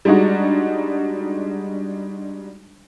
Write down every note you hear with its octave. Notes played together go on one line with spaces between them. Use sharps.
G3 G#3 D4 D#4 F#4